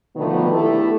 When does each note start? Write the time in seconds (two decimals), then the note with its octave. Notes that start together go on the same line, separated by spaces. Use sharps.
0.16 B2 D3 D#3 F3 A3 B3
0.52 A3 B3 E4 G4 A4